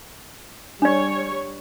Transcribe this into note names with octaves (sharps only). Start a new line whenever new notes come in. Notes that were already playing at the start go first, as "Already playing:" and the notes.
G3 D4 C#5 D5